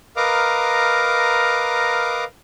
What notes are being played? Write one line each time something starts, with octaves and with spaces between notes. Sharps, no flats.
A#4 B4 D#5 F5 A#5 D6